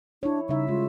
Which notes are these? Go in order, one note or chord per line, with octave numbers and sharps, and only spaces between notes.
D4 E4 C#5
C#3 G3 D#4 E5
G#3 F4